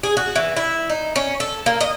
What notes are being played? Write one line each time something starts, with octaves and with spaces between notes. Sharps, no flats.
G#4
F#4
E3
E4
D#4
C#4
A4
A#3
D#5